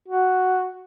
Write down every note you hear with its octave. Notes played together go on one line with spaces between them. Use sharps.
F#4